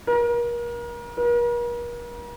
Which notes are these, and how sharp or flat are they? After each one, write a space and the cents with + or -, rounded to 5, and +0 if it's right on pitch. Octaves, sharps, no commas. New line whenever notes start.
A#4 +35
A#4 +45